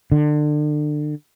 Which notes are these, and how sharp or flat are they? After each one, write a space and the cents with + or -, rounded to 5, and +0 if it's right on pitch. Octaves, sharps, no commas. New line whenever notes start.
D3 +30